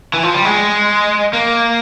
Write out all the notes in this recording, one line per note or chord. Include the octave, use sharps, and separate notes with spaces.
E3
F3
G3
G#3
A#3